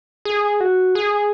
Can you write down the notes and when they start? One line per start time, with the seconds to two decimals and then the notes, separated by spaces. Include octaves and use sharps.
0.25 G#4
0.60 F#4
0.95 G#4